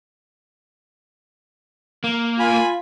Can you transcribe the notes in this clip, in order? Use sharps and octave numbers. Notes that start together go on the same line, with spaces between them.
A#3
F4 G#5 B5